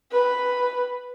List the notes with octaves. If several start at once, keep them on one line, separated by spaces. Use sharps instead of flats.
B4